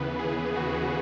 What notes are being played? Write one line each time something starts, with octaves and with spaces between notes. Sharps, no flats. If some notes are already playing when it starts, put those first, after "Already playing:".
Already playing: D#2 C#3 E3 B3 B4
G#4
F#4